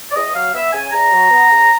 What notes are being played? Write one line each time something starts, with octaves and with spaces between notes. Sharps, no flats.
D5
E2 D#5
F#3 F5
B3 E5
C#3 G#5
E2 A#5
F#3
B3
C#3